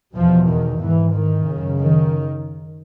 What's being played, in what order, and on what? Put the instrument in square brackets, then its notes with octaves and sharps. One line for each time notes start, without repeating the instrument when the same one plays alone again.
[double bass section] E2 B2 F3
D#3
G#2 E3
D#3
F#2 C#3
D#3